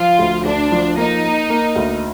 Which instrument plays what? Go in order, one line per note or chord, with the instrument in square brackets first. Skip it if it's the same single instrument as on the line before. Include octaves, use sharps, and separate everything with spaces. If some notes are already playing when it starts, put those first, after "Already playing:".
Already playing: [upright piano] F3 [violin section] F4
[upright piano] D2
[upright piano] D2 [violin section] D4
[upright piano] F3
[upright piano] A#3 [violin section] D#4
[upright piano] A#3
A#3
D2